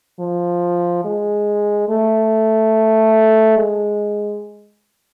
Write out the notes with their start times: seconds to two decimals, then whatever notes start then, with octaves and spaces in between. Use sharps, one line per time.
0.20 F3
1.05 G#3
1.89 A3
3.57 G#3